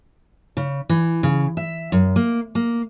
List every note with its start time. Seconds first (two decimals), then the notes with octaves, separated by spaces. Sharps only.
0.57 C#3
0.89 E3
1.23 C#3
1.57 E5
1.92 F#2
2.16 A#3
2.55 A#3